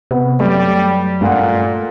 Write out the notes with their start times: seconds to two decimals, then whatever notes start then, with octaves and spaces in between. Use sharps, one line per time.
0.11 C3 B3 B4
0.40 F#2 G3 A3
1.21 G2 A#2 A3 F5 F#5